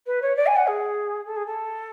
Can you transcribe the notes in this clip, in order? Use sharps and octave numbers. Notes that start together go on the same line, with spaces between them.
B4
C#5
D5
G#5
F#5
G#4
A4
G#4
A4